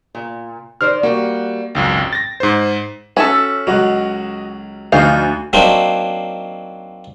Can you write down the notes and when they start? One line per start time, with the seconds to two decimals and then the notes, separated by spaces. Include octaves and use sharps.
0.15 A#2
0.81 D#3 C5 D5 F6
1.03 G3 A#3 F#4
1.75 G#1 C#2 F#2 G5
2.13 A6 A#6
2.40 G#2 C5
3.17 C#4 F#4 A4 E5
3.67 C#2 F#3 F#4 D#5 F#5
4.92 D2 F3 D#4 F5 G6
5.53 F#3 A#3 C4 D4 D#4